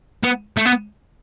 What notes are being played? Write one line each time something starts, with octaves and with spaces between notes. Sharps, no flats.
B3
A3
B3